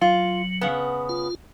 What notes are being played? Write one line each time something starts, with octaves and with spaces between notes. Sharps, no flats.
F#3 F4
C#3 B3
F4